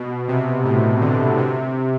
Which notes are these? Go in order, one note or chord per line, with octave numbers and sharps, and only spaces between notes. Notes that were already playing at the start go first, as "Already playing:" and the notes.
Already playing: B2
C3
A2
D3
C3